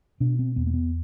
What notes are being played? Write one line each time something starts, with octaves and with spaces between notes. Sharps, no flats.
B2 D4
C4
E2 B3
A#3
B3